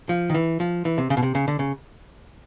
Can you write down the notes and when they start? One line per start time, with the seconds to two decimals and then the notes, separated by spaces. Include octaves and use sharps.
0.09 F3
0.30 D#3
0.34 E3
0.60 F3
0.85 E3
0.98 C3
1.10 C#3
1.17 B2
1.23 C3
1.35 C#3
1.48 D3
1.59 C#3